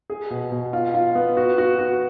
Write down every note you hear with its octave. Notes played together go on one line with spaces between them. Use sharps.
G#4
B2
B2
F4
F4
B3
F#4
F#4
F#4